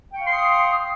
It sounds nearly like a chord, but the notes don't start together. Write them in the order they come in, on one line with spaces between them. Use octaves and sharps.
G5 C#6 F5 C6 D#6